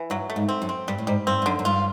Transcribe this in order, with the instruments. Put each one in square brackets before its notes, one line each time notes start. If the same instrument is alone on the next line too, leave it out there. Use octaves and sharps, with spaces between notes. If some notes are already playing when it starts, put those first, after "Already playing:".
Already playing: [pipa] E3
[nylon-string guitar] G2 [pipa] F#3
[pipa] A3
[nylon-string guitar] G#2
[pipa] C4
[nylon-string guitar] F#2
[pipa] C4
[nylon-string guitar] G2 [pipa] G3
[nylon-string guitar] A2
[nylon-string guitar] G#2 [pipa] G3
[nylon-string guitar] G2 [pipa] C4
[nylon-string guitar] G2
[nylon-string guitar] F#2 [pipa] D3
[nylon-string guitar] F#2
[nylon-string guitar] G2 [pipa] F4